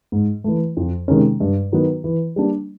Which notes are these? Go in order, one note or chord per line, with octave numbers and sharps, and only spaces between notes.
G#2
E3 A3
F2
C3 D#3 G#3 C#4
G2
D#3 F#3 B3
E3
G3 A#3 D4